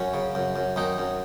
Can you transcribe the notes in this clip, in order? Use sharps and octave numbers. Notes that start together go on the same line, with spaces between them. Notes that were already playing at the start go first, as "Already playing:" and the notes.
Already playing: F#2 C#4
C#3
F#2
F#2
F#2 D#3 D#4
F#2